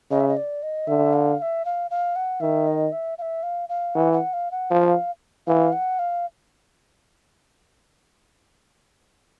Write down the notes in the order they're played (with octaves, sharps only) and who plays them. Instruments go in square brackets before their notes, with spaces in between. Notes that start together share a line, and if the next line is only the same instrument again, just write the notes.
[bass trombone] C#3 [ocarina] D#5
[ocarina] E5
D#5
D5
D#5
[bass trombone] D3 [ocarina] E5
[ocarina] F5
F5
E5
F5
F5
F#5
[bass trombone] D#3 [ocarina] E5
[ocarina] D#5
E5
F5
E5
F5
F5
[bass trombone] E3 [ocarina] F#5
[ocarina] F#5
F5
F#5
[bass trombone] F3 [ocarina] F5
[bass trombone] E3 [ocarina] F5
[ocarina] F#5
F5